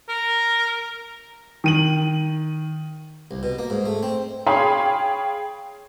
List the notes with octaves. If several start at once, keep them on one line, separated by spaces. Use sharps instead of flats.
A#4
D#3 D#7 F#7
C2
B2
A#3
G#2
A3
C4
G#4 C#5 F5 G5 B5 C6